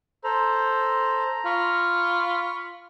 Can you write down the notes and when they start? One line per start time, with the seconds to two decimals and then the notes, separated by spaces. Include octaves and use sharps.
0.24 A4 C5 A#5
1.45 F4 B5 C#6